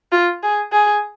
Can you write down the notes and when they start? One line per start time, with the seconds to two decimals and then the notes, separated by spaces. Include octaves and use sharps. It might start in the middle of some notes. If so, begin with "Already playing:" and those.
0.12 F4
0.43 G#4
0.72 G#4